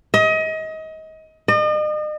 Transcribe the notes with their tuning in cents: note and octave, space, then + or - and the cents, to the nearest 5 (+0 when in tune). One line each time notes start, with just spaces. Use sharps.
D#5 +30
D#5 -40